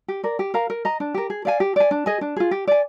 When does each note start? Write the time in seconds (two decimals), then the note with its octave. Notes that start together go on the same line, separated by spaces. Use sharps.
0.08 G4
0.23 A#4 D5
0.39 G4
0.54 A#4 F5 A#5
0.70 A#4
0.85 D#5 A#5
1.00 D4
1.14 G4 A#4
1.30 G#4
1.45 D5 F5 G#5
1.60 G4
1.76 D5 G#5
1.91 D4
2.06 G#4 D#5 G#5
2.21 D4
2.36 F4 G#4
2.51 G4
2.67 D5 G#5